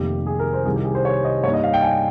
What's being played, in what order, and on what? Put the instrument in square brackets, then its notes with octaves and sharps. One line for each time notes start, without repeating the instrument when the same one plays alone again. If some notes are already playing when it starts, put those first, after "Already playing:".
Already playing: [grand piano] F1 F2 C3 D#3 A#3 G4
G#4
A#4
C5
C2 C3 D#3 G3 G#4
G4
G#4
C5
C#5
D#5
G2 G3 A#3 D#4 C#5
D#5
F5
G5
G#5